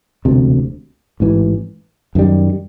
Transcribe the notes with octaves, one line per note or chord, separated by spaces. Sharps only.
E1 D2 C3
A1 G#2 E3
F#2 D#3 G3